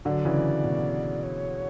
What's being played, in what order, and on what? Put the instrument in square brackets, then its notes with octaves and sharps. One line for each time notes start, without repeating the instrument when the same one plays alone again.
[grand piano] D3 F#3 [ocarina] D5
[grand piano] C#3 E3
B2
[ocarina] C#5